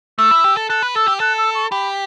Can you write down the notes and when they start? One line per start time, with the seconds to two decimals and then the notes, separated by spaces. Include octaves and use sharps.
0.18 A3 E6
0.31 E4
0.44 G4
0.57 A4
0.69 A4 F#6
0.83 B4
0.95 A4 E6
1.08 G4
1.20 A4 F#6
1.38 E6
1.55 C#6
1.71 G4 B5